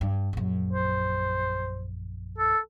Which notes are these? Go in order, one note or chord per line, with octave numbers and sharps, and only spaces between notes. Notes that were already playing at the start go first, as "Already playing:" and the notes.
G2
A#1 F#2
C5
A4